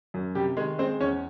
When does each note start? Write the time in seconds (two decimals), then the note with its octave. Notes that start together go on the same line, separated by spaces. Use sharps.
0.14 F#2
0.35 C3 G3 G4
0.57 D#3 G#3 G#4
0.78 G#3 C4 C5
1.00 E2 C#4 C#5